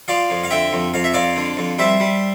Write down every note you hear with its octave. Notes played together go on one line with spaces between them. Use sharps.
F3 D5 F5
F2
F5
D3 E5 G5
F2
F2 F5
E5
F2 D5 F5
D3
F2
G3 C5 E5
G3